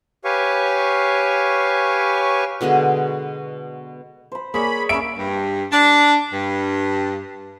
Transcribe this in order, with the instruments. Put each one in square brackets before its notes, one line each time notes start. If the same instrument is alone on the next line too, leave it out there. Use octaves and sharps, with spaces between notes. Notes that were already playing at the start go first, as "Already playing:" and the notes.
[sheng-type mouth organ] G4 B4 C#5 F5 G#5 C#6
[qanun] B2 D3 G#3 G#4
[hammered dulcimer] C5 B5
[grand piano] A#3 [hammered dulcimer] G#4 C#5 D5 [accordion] B5
[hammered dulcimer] A#3 C#4 [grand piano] E5 B5 [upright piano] D7
[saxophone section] G2
D4
G2